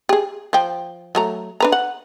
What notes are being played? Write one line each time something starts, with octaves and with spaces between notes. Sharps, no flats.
G4 G#4
F3 G5
F#3 A3 A#5
D4 B4 A#5
F#5